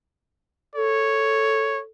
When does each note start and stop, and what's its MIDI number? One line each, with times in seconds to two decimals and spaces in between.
0.76 1.90 69
0.76 1.81 73